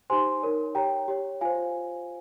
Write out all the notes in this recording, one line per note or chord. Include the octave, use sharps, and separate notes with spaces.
D#4 G4 C5 G#5 C6
D#4 A#4 C#5
G4 C#5 G5 A#5
G4 C#5
F4 C5 F5 G#5